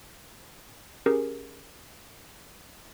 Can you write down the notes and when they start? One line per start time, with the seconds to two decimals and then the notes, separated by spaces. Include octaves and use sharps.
1.06 C#4 G4 G#4 A#4